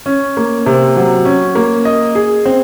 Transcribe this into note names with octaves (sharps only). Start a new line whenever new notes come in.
C#4
A#3
C3
F#3
C#4
A#3
D#5
G#4
C4